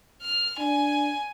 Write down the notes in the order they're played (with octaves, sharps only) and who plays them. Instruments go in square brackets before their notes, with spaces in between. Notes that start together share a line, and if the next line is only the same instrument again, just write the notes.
[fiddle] F6
[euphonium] D4 [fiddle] G#5